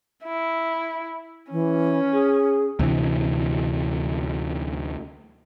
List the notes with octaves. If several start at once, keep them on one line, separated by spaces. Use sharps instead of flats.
E4
E3 C#4
G#4
D2 C3 E3